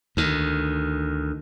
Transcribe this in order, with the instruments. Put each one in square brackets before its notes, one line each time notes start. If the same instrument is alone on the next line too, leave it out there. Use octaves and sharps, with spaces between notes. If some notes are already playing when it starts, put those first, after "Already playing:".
[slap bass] D2 D#3